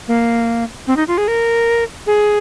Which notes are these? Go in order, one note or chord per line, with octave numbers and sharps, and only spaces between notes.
A#3
C4
D#4
F4
G#4
A#4
G#4